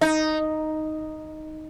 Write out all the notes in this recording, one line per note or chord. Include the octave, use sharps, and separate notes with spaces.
D#4